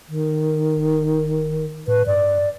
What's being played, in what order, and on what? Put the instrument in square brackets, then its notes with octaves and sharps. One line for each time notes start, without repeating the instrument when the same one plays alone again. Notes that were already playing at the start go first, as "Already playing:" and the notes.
[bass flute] D#3
[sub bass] D1
[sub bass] A2 [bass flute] B4
[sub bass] G2 [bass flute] D5